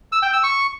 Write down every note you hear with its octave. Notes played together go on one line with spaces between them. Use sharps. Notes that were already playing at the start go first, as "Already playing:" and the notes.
E6
G5
E6
C#6